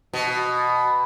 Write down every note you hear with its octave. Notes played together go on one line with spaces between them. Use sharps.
B2